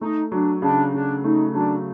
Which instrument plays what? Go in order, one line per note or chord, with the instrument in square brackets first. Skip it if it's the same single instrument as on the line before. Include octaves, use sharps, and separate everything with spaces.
[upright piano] A3 [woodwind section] D#4
[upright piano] F#3 [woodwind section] D4
[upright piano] C#3 [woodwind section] D4
[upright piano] C#3 [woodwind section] D4
[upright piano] A3 [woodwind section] D#4
[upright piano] F#3 [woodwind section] D4